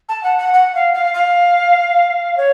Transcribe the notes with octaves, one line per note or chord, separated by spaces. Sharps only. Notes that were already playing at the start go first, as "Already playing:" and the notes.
A5
F#5
F#5
F#5
F5
F5
F5
C#5